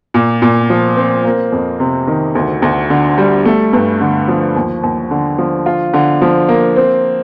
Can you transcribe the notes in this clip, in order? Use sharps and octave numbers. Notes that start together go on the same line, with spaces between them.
A#2
A#2
F3
C4
A#3
F2
C3
D#3
D2
D2
D3
G3
A3
G2
D3
F3
D#2
D#2
D3
F3
F4
D3
F3
A#3
C4